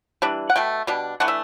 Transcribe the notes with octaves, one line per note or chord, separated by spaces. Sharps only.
E3 G3 D4
F#5
B2 A3 G5
B2 G3 D4
E3 A3 D4 F#5
E5